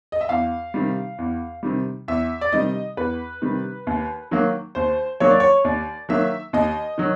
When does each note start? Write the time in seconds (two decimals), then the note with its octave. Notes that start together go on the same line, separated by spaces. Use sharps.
0.12 D#5
0.21 E5
0.29 E2 F5
0.74 C3 D#3 G3
1.18 E2
1.63 C3 D#3 G3
2.08 E2 E5
2.41 D5
2.52 C3 D#3 G3 D#5
2.97 E2 B4
3.42 C3 D#3 G3
3.87 D#2
4.31 D#3 F#3 A#3
4.75 D#2 C5
5.20 D#3 F#3 A#3 C#5
5.30 D5
5.40 C#5
5.64 D#2 D5
6.09 D#3 F#3 A#3 E5
6.53 D#2 D#5
6.98 D#3 F#3